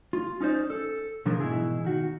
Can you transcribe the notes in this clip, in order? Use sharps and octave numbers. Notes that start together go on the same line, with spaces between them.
F4
C#4 D#4 A4 C5 D5
A4
B2 F3 D4 G#4 A#4
G#2 B2 D#3 E3 E4 G#4
D#3 F#4